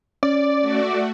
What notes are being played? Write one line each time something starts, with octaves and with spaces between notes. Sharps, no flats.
C#4 D5
A3 F#4